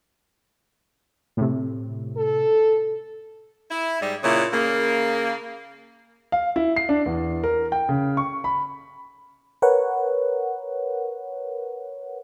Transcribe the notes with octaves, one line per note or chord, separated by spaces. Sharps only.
A2 C3
A4
E4
G#2 G3
A#2 C#3 E4
C#3 A#3
F5
E4
C7
D4
E2
A#4
G5
C#3
C#6
B5
A#4 B4 C#5 F#5